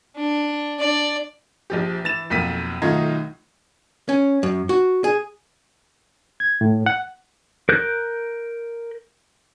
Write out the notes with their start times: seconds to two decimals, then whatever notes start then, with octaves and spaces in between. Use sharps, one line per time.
0.16 D4
0.80 D4 D5
1.70 A#1 F3 G4
2.04 E3 A6 E7
2.30 B1 F2 A#3 B6 D#7
2.82 B1 D#3 A3 D#4 F4 G#6
4.09 C#4
4.43 F#2
4.69 F#4
5.04 G#4
6.40 G#6
6.61 A2
6.86 F#5
7.69 A#4 F#6 G6